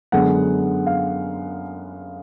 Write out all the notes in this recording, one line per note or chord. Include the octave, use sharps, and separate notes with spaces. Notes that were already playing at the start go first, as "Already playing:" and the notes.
F#2 D3 G#3 B3 F#5
F5